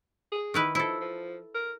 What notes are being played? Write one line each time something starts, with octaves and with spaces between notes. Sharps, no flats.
G#4
D#3 E4 B4
F3 E4 A4
F3
A#4